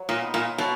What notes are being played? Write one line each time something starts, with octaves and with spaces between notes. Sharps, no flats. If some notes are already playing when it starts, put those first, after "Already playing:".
Already playing: F#3
A#2
B3 D#4
A#2
B2 F#3